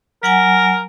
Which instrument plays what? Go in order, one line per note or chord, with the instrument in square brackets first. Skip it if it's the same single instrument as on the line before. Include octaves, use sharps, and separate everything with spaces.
[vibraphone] F#3 F#5 G#5 [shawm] A#4